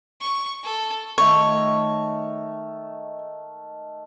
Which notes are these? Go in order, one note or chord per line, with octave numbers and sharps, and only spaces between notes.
C#6
A4
D#3 A3 C#5